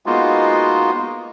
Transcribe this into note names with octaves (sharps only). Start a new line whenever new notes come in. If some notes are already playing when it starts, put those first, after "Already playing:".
G#3 A#3 B3 D#4 F4 F#4